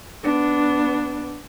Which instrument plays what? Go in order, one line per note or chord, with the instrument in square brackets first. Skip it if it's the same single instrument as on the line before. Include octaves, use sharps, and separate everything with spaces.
[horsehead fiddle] B3 D4